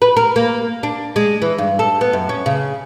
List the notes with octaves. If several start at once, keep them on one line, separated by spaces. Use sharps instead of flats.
B4
A#4
A#3
D4
G#3
E3
G2
A4
B3
F#2
C#4
C#3